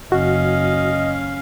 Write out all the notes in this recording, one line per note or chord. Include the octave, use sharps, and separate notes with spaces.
F#1 C#4 F#4 D#5 F5